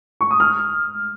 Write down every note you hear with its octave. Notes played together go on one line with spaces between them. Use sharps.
C#6
D#6
F6